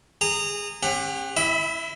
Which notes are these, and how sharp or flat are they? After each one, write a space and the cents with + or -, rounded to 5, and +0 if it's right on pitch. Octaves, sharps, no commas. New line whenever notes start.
G#4 -20 A#5 -25
C#4 -35 G4 +30 F#5 +0
E4 +0 E5 -40 B5 +30